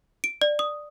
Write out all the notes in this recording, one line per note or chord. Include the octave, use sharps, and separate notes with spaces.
D7
D5
D#6